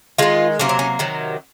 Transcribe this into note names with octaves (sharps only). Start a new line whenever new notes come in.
D#3 G#3 F4
C3 F#3 A#3 C#4
C4
C#4
C3 D#3 F#3